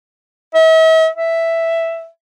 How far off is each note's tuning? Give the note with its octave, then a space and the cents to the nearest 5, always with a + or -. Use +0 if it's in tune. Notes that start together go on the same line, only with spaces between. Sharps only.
E5 -45
E5 +5